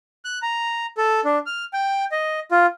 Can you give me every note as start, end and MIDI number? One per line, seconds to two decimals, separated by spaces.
0.25 0.39 90
0.42 0.86 82
0.97 1.21 69
1.25 1.39 62
1.46 1.65 89
1.73 2.05 79
2.12 2.40 75
2.51 2.66 65